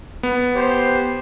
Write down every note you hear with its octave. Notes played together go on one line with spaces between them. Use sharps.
B3
G4 C5